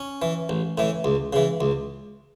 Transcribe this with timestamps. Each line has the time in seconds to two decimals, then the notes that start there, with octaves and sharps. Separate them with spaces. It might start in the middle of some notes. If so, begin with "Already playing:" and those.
Already playing: C#4
0.22 E3
0.49 A1
0.78 A2 E3
1.04 C#2
1.33 C#3 E3
1.61 C#2